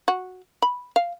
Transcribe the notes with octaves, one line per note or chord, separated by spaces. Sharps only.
F#4
B5
F5